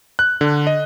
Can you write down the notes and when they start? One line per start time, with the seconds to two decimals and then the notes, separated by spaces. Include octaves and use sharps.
0.19 F#6
0.41 D3
0.67 D#5